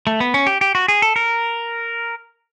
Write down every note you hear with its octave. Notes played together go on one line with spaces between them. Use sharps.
A3
B3
C#4
G4
G4
F#4
G#4
A4
A#4